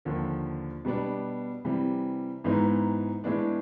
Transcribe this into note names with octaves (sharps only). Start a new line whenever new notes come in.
D#2 D3 F3
B2 G3 B3 D4
C3 E3 G3
G#2 E3 G#3 B3 D#4
A2 E3 G#3 B3 D4